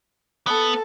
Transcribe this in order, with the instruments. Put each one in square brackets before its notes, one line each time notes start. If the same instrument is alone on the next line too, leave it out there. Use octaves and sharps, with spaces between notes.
[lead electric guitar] B3 [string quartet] A4